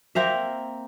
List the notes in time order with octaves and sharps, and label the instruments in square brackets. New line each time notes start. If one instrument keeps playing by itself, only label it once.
[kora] A#3 C4 A#4 E5